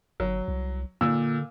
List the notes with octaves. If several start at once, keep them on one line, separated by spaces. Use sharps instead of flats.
G1 F#3
C2
A#2 D3 E6